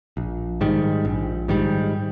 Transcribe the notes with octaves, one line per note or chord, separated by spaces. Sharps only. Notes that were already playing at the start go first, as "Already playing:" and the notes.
A#1
G#2 D#3 G3
A#1
G#2 D#3 G3